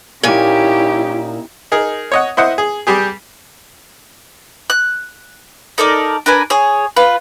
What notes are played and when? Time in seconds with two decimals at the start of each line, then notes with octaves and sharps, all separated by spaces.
0.23 A#2 C#4 D#4 E4 G4 G#5
1.72 D#4 G#4 A#4
2.12 C#5 D#5 F#5
2.37 E4 C5 D#5 F#5
2.58 G#4
2.87 G3 G4 G#4
4.70 F#6
5.78 D#4 A4 A#4 D5
6.26 D4 A#4 B4 G#5
6.50 G#4 C#5
6.96 F4 B4